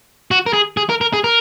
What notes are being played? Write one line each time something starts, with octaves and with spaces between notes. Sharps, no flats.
F#4
A#4
G#4
G#4
A#4
A#4
G#4
A#4